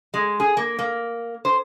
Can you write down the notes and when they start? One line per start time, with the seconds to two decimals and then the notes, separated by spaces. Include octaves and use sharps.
0.14 G#3
0.40 G#4
0.57 A#3
0.79 A#3
1.45 C5